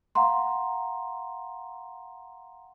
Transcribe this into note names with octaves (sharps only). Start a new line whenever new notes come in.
F5 F#5 A#5 C6